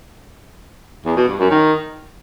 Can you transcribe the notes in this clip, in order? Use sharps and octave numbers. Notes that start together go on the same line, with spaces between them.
E2
B2
G2
F#2
D#3